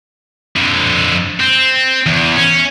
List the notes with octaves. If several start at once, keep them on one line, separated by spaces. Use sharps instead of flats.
F2 D3
C4
E2
C#4